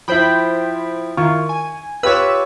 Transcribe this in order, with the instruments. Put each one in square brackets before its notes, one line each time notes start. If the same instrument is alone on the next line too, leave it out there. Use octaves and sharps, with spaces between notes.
[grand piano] F3 E4 [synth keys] C5 G5 B5
[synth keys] D#3 E4 F4 [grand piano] C#6
[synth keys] G#5
[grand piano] F4 G4 C#5 [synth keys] B4 E6